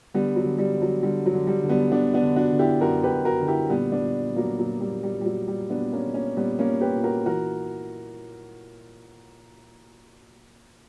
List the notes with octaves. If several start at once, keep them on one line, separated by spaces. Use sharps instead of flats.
D3 G3 B3
F#3
D3
G3
D3
F#3
D3 G3
F#3
D3
G3
D3
G3 B3
D3 B3 D4
B3 D4
D3
D4 F#4
D3
E4 G4
F#2 F#4 A#4
G4 B4
F#2
F#4 A#4
D3
E4 G4
A#2 G3 B3
B3 D4
A#2
A#2
F#3 A#3
A#2 F#3
G3
A#2
G3
A#2 G3
F#3
A#2 G3
B3 D4
A#2
A#3 C#4
A#2
A#3 C#4
A#2 G3 B3
A#3 C#4
A#2
G4 B4
A#2
F#4 A#4
E3 F#4 A#4